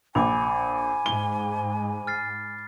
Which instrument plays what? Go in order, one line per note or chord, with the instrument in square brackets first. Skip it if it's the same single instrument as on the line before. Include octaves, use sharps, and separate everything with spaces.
[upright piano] A#1 [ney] G#5 [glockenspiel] B5 D6
[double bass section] G#2 [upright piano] G7
[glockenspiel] F6 A6 C7